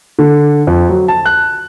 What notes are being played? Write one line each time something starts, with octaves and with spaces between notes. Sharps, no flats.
D3
F2
F#3
A5
F#6